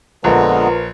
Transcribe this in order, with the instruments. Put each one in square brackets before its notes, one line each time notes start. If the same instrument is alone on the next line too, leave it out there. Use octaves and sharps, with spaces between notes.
[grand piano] A#1 [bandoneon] D3 G#3 B3 [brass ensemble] F4 A#4 B4 [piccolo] A#5